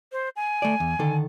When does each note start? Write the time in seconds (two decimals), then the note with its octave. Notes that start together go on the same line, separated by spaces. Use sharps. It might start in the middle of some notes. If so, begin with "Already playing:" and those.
0.12 C5
0.36 G#5
0.62 A3 D5
0.80 E2
0.99 D3 D#3 A4